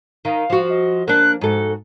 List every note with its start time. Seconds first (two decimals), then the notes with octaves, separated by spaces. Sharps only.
0.25 D#3 F5
0.50 F3 F#4
0.69 D#5
1.08 A#3 D4 F#6
1.41 G#2 F#4 A4